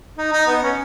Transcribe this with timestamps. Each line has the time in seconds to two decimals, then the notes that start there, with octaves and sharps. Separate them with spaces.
0.18 D#4
0.32 D#4
0.47 B3
0.63 C#4